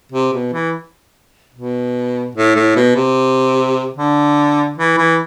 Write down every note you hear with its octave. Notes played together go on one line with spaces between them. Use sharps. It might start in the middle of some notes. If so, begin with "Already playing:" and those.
C3
B2
E3
B2
A2
A2
B2
C3
D3
E3
E3